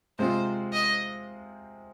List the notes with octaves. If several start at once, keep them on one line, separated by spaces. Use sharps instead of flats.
C3 G#3 C4 F4 C5
D#5